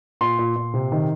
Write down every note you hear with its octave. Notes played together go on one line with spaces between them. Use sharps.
A#2 C6
A#2
A#2
C3
D#3